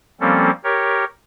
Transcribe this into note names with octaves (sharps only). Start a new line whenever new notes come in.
F3 G3 A#3 C4 C#4 A4
G4 A#4 C#5